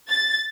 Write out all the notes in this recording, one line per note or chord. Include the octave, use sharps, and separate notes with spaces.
A6